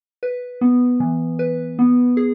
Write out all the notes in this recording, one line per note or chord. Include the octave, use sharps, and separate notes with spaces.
B4
B3
E3
B4
B3
G#4